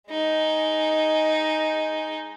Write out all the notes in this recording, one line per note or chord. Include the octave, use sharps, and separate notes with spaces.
G#3 D#4